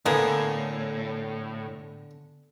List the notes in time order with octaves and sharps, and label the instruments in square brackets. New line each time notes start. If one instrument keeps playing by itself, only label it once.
[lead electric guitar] A2 [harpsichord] D3 [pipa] A#3 B3 G#4